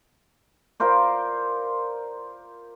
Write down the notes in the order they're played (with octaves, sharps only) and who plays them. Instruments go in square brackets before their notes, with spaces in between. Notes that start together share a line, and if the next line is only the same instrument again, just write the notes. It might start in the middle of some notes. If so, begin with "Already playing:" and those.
[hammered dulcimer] F4 A#4 C5 D5